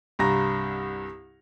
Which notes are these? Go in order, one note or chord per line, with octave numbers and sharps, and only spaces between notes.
C2 G2 A#5 A#6